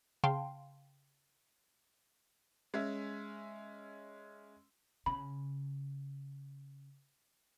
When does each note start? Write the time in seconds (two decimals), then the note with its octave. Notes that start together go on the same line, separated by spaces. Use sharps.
0.24 C#3 F5 G5 A5 C6
2.74 G#3 C#4 E5
5.06 C#3 B5